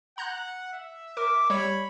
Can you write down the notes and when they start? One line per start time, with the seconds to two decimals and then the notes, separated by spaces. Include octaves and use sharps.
0.18 F#5 A#5 F#6 G6
0.73 E5
1.17 A#4 D6
1.50 G3 C#5 B5